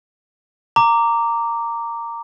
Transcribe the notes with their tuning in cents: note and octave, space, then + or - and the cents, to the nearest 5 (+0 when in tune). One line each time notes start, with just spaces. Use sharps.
A#5 -10 D6 -5